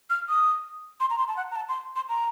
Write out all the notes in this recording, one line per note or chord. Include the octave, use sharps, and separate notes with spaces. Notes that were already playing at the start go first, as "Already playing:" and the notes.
F6
D#6
C6
A#5
C6
A5
F#5
A#5
A5
C6
C6
A#5